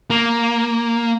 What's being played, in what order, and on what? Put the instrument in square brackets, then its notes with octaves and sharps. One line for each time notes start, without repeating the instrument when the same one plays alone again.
[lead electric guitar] A#3